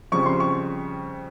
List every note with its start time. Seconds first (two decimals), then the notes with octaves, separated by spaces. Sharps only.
0.12 F2 C#3 G3 C#6
0.26 C6
0.40 C#6